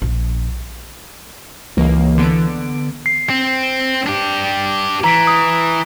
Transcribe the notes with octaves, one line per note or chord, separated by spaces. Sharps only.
A#1
C#2 E3 A#3
D3 B3 D7
C7
C4
D4 G4
E3 A#5 B6 D7
D#6